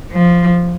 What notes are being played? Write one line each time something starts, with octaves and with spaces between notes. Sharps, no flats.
F3